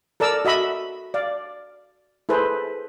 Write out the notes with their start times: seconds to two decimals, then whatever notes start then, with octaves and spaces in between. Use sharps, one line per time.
0.20 A4 A#4 D5 A5 E6
0.45 F#4 D#5 E5 B5
1.14 D5 F5
2.29 E4 G#4 A4 B4 C5